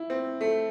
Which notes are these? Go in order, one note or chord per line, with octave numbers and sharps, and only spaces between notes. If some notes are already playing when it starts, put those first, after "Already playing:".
Already playing: E4
C4
A3